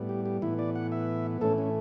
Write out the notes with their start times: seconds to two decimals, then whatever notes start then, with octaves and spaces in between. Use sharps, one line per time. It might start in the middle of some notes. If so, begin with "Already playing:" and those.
Already playing: A2 G3 B3
0.09 G4
0.26 G4
0.42 A2 E3 B3 E4
0.59 D5
0.76 F#5
0.92 E5
1.41 A2 E3 A3 C#4 A4
1.58 C#4